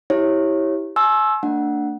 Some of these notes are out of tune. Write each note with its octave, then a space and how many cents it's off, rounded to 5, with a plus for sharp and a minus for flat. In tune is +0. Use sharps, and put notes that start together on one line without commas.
E4 -15 G4 +0 C#5 -20
G#5 +45 C6 +40 E6 +0
A3 +40 D4 +0 F#5 +0